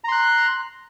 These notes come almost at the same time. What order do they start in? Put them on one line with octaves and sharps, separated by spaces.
A#5 C6 F#6